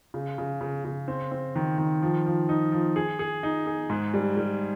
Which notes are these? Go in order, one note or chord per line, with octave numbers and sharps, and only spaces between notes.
C#3
C#3
C#3
C#3
C4
C4
D#3
D#3
F3
F3
D#4
F3
G#4
G#4
D#4
G#4
G#2
G3
G3